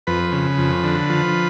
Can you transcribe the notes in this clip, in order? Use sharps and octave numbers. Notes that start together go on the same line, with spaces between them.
F2 B4
C#3
F2
D3
F3